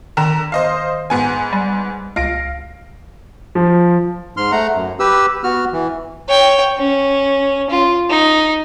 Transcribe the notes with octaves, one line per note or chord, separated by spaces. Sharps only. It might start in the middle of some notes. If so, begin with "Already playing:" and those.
D3 D#3 A#5 E7
C5 D#5 F5
G#2 B3 G#5
G3
C#2 F5 A#6 D7
F3
G#2 C6 F6
A3 F#5 A#5
F#2
G4 B4 E6
B3 F#4 F6
E3
C#5 G5
C#4
F4
D#4